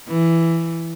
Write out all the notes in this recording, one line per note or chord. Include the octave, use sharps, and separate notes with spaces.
E3